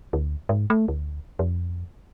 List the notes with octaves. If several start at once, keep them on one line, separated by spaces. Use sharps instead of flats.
D2
G#2
A3
D2
F2